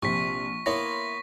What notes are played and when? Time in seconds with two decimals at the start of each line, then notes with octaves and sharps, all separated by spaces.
0.02 A#1 C3 C#6 B6
0.66 A#3 B3 E4 C#5 C6 A#6